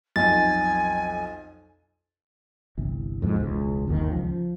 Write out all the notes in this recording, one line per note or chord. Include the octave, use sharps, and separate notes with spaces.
B1 F2 G#5 A6
G1 C2 E3
F2 G#2 B2
E1 C#2
G1 D#2 A#2 D#3
C#2 F3
F3